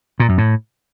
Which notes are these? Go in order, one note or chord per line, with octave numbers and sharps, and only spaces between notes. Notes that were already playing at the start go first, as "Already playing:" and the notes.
A#2
F#2
A2